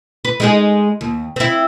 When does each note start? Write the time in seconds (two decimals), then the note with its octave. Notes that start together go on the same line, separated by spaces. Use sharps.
0.25 B4
0.40 G#3 D#4 G#4
1.01 D#2
1.36 C4 E4